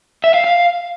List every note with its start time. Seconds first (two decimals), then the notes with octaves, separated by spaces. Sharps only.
0.24 E5
0.34 F5
0.44 F5